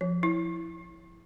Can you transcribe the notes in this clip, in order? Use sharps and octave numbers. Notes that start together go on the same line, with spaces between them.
F3
E4